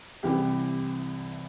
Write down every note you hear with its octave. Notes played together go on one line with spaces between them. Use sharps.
C2 C3 E3 G4